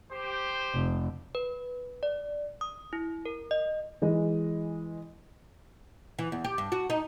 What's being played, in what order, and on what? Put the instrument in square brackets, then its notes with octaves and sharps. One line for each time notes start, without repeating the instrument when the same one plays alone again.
[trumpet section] G4 C5
[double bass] F1
[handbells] B4
D5
D#6
E4
A#4
D#5
[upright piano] E3 G#3 D#5
[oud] E3
E2
G4
G2
F#4
D#4